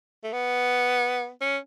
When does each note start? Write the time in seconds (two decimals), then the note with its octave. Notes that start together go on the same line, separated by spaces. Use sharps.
0.24 A3
0.33 B3
1.41 C#4